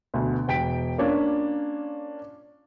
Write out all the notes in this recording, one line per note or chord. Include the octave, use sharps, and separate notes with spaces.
D2 B2
E1 G5 B6 D7
A#3 C#4 D4 F4